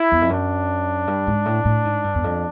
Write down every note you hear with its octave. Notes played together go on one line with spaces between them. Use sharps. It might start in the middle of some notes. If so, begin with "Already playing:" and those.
Already playing: E4
E2
F2
F#2 D4
G2
G#2
A2
A2
G#2
G2
E2
F2